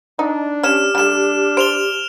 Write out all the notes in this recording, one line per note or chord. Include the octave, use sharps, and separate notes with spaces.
D4 D#4
C#4 G4 F6 E7
G3 A3 D4 F6 E7
C5 D7 F7 G7